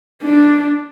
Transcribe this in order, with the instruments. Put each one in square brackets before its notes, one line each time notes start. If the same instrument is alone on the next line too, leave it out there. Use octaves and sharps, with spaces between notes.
[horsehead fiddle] D4